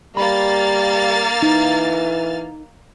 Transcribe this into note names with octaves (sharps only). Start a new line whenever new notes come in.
G3 A#3 B5 F6 A6
E3 D#4